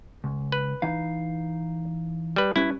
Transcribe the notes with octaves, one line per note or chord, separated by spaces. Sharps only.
C#2
B4
E3 D#4 F5
G3 B4
G3 C#4 E4 B4